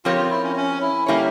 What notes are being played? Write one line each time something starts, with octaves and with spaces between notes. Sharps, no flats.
F3 C4 F4 G4 A#4 C#5
F4
E4
C#4
C#4
E4
G3 A#3 C#4 E4 A#4 C#5